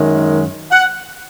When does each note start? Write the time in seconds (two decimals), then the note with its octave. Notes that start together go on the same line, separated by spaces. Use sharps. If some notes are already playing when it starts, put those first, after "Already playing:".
Already playing: F#2 D#3 G#3
0.71 F#5